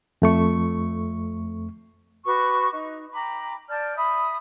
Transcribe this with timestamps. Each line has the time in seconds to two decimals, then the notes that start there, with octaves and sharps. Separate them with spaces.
0.22 F2 A3 C#6
2.25 F#4 B4 C#6 D6
2.72 D#4
3.13 G5 A#5 B5 D6
3.69 D5 A5 F6 G6
3.96 E5 B5 D#6